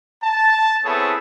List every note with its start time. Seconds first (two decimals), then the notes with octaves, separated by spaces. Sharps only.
0.23 A5
0.85 B3 C4 E4 G#4 A4 C#5